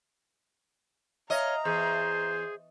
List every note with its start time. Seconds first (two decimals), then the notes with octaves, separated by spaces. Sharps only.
1.30 C#5 D#5 F5 A#5
1.65 E2 G#4 C5